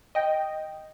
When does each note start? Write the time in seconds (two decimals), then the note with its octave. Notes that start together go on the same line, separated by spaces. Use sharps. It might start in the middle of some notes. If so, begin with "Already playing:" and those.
0.15 D#5 G5